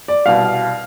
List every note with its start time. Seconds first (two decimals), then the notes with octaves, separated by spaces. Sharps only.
0.08 D5
0.25 C2 B2 F5